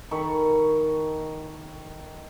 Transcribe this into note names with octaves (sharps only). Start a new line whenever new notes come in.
D#3 A4 B5 C#6